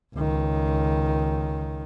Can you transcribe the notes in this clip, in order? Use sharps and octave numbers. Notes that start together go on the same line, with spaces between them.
C#2 D#3